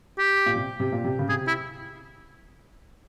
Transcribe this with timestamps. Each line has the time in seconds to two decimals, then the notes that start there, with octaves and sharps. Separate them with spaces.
0.18 G4
0.46 A#2
0.56 C3
0.80 C3
0.92 A#2
1.04 C3
1.19 C#3
1.29 C3 G#4
1.47 E4